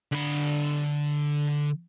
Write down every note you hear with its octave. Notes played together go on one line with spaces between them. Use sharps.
D3 B5